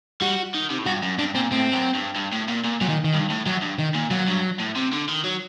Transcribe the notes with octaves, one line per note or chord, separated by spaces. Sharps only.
G3 F#4
D#3
C3
A2
G2 F#4
F#2
G2 D4
A#2 C4
A2 C4
F#2
G2
G2
A2
A#2
A#2
A#2 F#3
D#3
D#3
G2
A2
F#2 F#3
G2
D#3
A#2
A#2 F#3
G2
A2
C3
D3
D#3
F#3